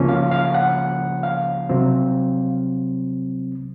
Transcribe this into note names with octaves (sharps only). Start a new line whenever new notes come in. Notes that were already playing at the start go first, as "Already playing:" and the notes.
Already playing: C#2 C#3 F3 A#3 C#4
F5
F5
F#5
F5
C2 C3 F#3 C4